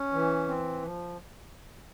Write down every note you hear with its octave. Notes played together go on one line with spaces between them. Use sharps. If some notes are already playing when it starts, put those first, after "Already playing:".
Already playing: C#4
E3
C4
F3